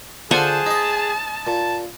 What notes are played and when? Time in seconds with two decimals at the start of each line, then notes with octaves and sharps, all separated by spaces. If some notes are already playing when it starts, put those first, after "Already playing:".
0.31 D3 F4 G#4 C5 F#5 G#5 A5
0.66 D#4 D#5
1.47 A#2 A5